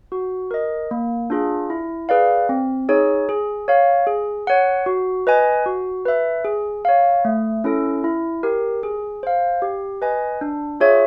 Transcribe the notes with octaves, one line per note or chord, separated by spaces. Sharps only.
F#4
A#4 D#5
A#3
D4 F4 G#4
E4
G#4 B4 D5 F5
C4
D#4 G#4 C#5
G#4
C#5 F5
G#4
C#5 F#5
F#4
B4 D#5 G#5
F#4
B4 E5
G#4
C#5 F5
A3
C#4 E4 A4
E4
G4 A#4
G#4
C5 F5
G4
B4 D#5 G#5
D4
F4 G#4 C#5 E5